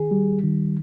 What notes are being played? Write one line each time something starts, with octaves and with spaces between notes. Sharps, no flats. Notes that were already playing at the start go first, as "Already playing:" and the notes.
Already playing: D#3 G#4
G3
D#3